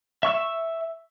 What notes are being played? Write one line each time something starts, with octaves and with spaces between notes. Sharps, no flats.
E5 C#6 E6